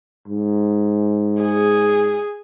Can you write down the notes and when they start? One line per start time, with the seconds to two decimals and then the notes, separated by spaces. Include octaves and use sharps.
0.28 G#2
1.42 G#4